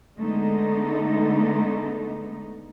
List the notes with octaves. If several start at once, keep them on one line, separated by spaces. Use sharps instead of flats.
D3 G#3 A3 B3 D#4